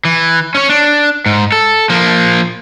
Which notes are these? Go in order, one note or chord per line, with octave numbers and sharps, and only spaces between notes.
E3
C#4 C#5
D4
G#2
A4
F3 A#3